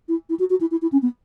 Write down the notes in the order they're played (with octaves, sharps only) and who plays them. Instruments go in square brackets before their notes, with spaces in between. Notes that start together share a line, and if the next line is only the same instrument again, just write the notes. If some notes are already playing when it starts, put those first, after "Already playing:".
[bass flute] E4
E4
F#4
F#4
E4
E4
E4
C#4
B3